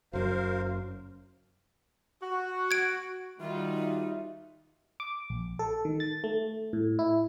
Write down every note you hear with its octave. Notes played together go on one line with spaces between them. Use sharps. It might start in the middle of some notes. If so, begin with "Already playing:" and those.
F#1 F#2 F#4 A#4 C5 F5
F#4
G#6 D7
D#3 G3 D#4 F4 F#4 E5
D6
A#1
A4
D#3
A6
A3
A2
E4